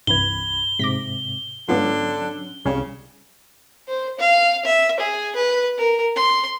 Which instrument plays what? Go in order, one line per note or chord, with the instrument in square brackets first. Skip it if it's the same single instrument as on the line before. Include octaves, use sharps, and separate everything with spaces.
[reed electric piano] C2 B5 G#6 [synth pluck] G2 E3 [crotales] G7
[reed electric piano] G#2 C3 [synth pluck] D6 A#6 B6
[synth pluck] G#2 B3 F4 [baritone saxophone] D3 [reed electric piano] F#3 C#4
[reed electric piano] C2 [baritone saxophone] C#3 [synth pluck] G3 C#4
[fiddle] C5
F5
E5
G#4
B4
A#4
C6